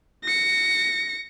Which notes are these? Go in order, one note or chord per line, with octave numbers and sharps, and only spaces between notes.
A#6 C#7